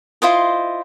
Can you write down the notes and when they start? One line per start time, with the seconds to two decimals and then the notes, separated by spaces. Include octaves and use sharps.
0.22 E4 F4 C5 D#5